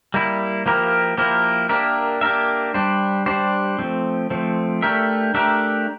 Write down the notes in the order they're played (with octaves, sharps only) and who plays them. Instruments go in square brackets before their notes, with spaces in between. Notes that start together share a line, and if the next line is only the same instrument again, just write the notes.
[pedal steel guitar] G3 A#3 E4
F3 A#3 E4 G4 A#4
F3 A#3 E4 G4 A#4
A#3 D4 G4 A#4 E5
A#3 D4 G4 A#4 E5
G3 D4 G4 C5
G3 D4 G4 C5
F3 A3 C4
F3 A3 C4
A3 D4 G4 A#4 E5
A3 D4 G4 A#4 E5